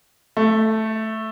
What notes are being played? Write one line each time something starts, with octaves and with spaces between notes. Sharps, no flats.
A3